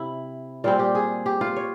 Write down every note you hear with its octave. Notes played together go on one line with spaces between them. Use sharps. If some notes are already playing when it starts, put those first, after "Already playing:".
Already playing: C3 E4
A#2 G3 C4 F4
G4
G#4
G4
F4
C#5